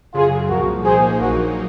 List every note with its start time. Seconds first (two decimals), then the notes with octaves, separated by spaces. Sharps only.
0.14 F#2 C#3 F#3 F4 G#4
0.49 C2 A#2 F3 F#4 A#4
0.84 A#2 F3 A#3 D#4 G#4 C5
1.20 A#1 A#2 F#3 A#3 D#4 F#4 A#4